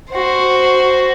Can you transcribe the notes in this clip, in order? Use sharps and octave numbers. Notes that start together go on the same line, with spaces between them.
F#4 C5